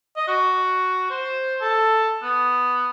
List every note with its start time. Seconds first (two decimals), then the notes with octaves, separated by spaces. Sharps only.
0.17 D#5
0.28 F#4
1.10 C5
1.61 A4
2.22 B3